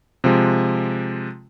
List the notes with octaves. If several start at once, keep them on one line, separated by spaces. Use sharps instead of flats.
C3 F3 G#3